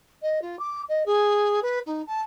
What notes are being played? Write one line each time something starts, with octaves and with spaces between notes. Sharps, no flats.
D#5
F4
D6
D#5
G#4
B4
D#4
A5